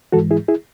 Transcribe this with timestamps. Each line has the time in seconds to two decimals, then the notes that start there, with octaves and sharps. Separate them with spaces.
0.12 G#2 E3 G#3 F#4 A4
0.31 E4 G#4
0.48 E4 G#4